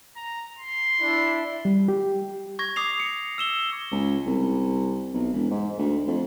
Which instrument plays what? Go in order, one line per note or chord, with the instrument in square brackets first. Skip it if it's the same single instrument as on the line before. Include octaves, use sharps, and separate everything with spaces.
[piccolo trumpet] A#5
C6
[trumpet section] D4 E4
[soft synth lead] G3
G4
[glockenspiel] C#6 G#6 A#6
D6 D#6 C7 F7
C#7
E6 E7 G7
[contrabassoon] C#2
C2
B1
E1
G#2
D2
F2